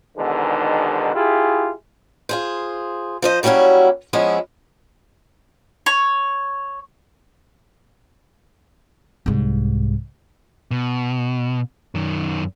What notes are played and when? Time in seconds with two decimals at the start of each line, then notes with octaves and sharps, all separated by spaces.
0.16 E2 G#2 B2 D3 D#3
1.14 E4 F4 G4 G#4
2.29 F4 G#4 C5
3.22 F3 C5 D#5
3.43 F#3 G3 A#3 C#4 E4 F#4
4.13 F3 G#3 B3 C#4 E4
5.86 C#5
9.26 C2 G#2
10.71 B2
11.95 F#2 D#3